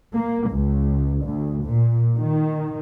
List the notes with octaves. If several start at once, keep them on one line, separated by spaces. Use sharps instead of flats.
A#3
C#2
D2
A#2
D#3